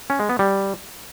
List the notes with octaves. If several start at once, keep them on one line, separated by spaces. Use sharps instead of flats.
C#4
G#3
B3
G3